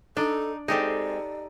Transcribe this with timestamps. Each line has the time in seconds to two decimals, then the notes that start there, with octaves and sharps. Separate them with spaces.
0.17 D4 D#4 A4
0.68 G#3 A#3 C4 D#4 G4 A4 D5